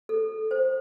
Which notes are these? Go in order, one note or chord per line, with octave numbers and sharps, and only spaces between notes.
A4
C5